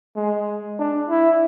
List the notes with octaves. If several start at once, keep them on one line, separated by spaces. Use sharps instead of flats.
G#3
D4
E4